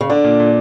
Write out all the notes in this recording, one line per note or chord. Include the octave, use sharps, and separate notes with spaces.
C#3
D3 D4
A#2
A#2